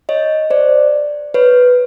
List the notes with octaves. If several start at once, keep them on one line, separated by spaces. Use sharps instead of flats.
C#5 D#5
C5 D5
B4 C#5